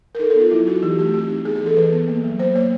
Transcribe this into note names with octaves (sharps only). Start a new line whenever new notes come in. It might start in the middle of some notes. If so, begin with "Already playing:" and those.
A#4
D#4 A4
A4
B3 F4
F#3 E4
D#4 F#4
E3 G4
A3 G4
C4 G4
D#4
B3 G#4
G#4
E3 A4
E3 B4
B3
A#3
F#3
A#3 C5
A#3 C#5